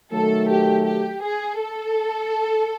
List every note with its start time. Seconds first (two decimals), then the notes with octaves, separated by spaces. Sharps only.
0.12 D#3 F#3 A3 A4
0.50 G4
0.86 G4
1.22 G#4
1.59 A4